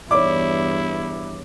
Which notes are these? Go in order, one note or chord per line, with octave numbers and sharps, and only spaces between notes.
E2 G2 E4 C#5 D5 D6